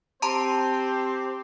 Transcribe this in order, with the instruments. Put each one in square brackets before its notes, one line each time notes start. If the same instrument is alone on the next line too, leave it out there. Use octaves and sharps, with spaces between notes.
[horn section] C4 G4 C5 [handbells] A5 A#5 C6